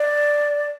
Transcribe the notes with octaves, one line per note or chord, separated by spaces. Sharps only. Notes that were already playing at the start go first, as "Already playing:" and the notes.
Already playing: D5